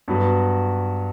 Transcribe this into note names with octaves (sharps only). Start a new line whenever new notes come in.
G2 F#3 B3 F#4